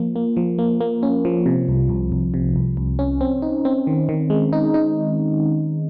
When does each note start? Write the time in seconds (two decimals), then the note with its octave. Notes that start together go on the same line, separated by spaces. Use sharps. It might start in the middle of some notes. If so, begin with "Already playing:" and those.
Already playing: F3 A#3
0.16 A#3
0.37 F3
0.59 A#3
0.81 A#3
1.03 C#4
1.25 F3
1.46 C3
1.68 C2
1.89 C2
2.12 C2
2.34 C3
2.56 C2
2.77 C2
2.99 C#4
3.21 C4
3.42 D#4
3.65 C4
3.87 D#3
4.09 D#3
4.30 G#3
4.53 D#4
4.74 D#4